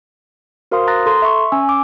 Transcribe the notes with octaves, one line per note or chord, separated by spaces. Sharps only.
F#4 A#4 C5 F5 C6 D#6
A#5 D#6 F#6 A6 A#6
A4 A#5 C6
E5 C#6
C#4 G#5 E6
D6